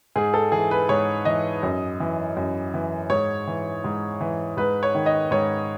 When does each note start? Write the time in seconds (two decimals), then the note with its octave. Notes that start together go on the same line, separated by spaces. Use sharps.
0.16 G#2 G#4
0.34 A4
0.52 E3 G#4
0.71 B4
0.89 G#2 C#5
1.25 E3 D#5
1.63 F#2
2.00 E3
2.37 F#2
2.74 E3
3.10 G#2 C#5
3.47 E3
3.84 G#2
4.21 E3
4.57 G#2 B4
4.83 C#5
4.95 D#3
5.06 D#5
5.31 G#2 C#5